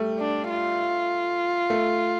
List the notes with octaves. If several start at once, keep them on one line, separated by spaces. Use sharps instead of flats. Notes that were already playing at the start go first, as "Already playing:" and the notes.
Already playing: G3 A3
D4
F4
A3